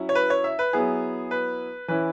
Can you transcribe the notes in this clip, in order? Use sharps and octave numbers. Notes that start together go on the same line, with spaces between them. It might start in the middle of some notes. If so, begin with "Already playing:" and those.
Already playing: F#3 C#4 E4
C#5
B4
C#5
E5
B4
F#3 B3 E4 G#4
B4
E3 C#4 E4 B4